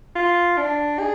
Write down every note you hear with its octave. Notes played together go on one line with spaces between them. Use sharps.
F4
D4
G#4